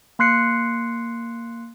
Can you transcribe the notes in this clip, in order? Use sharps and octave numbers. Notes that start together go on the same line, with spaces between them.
A#3 C6 F#6 C7 C#7